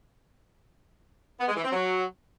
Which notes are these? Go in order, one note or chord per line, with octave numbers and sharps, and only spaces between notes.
B3
G#3
E3
C4
F#3